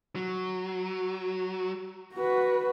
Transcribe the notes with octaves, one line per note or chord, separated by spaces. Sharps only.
F#3
F#4 B4